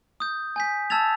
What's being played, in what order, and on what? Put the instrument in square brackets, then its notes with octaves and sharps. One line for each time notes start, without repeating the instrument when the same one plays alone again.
[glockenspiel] D#6 G6
G#5 G6 B6
A5 E6 G#6 A6 F7